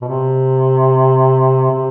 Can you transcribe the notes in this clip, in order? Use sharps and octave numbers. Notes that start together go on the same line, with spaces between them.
B2
C3
C3